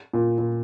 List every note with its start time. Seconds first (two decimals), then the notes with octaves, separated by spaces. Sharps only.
0.13 A#2
0.38 A#2